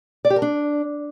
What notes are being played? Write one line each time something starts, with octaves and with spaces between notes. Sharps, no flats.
D5
G4
A#4
D4